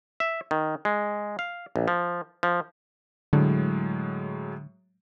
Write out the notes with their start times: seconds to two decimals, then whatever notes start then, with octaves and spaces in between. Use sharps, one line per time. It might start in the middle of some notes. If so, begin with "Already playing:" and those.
0.20 E5
0.51 D#3
0.85 G#3
1.39 F5
1.76 A#1
1.88 F3
2.43 F3
3.33 A2 D3 F#3 G#3